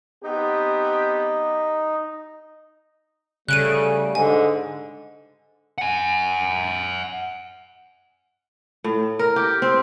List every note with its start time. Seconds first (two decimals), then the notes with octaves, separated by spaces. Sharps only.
0.24 B3 C4 D#4 G4
3.49 C#3 G3 A3 F#6 D7 D#7
4.15 G#2 D3 G#5
5.78 F#5 G#5
8.84 A2
9.19 A#4
9.36 G4
9.62 C4